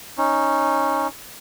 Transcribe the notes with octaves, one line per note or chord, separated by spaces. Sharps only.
C#4 D#4